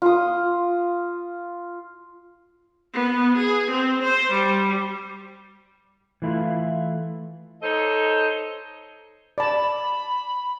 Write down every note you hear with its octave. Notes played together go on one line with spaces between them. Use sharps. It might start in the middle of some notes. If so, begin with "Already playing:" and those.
F4 D#6
B3
G#4
C4
C5
G3
E3 A3 E4 F4
D#4 A4 C5 C#5 D#5
D5 A5 B5